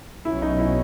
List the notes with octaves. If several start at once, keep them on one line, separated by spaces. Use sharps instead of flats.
B1 B2 F#3 C#4 E4
D#4
E4